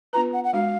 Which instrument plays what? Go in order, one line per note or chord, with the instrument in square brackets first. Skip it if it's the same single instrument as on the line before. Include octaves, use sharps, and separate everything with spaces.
[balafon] B3 D4 F4 B4 [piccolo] A#5
[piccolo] F#5
F#5
[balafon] G#3 D4 F#4 [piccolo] F5